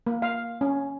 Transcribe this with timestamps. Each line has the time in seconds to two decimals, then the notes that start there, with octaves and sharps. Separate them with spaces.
0.07 A#3
0.22 F5
0.61 C#4